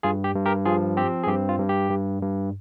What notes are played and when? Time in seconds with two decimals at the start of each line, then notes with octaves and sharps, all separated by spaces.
0.03 G2 F4 G#4
0.24 G4
0.35 G2
0.45 G4 A#4
0.65 F3 F4 G#4
0.97 C4 G4
1.24 G#4
1.27 G2 G4
1.49 F4
1.59 G2
1.69 G4
1.91 G2
2.22 G2